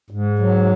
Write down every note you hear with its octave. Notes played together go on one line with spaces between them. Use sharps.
G#2
F#3